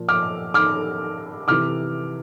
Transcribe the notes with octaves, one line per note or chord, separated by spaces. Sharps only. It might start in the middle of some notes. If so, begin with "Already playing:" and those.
Already playing: A#2 F3
D6 F6
D6 F6
C3 E3 D6 F6